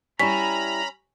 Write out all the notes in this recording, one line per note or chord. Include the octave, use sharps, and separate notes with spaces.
G3 C#4 E4 A#5 B5 B6